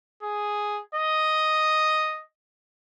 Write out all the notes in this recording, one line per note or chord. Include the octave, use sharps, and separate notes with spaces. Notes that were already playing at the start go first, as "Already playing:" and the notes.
G#4
D#5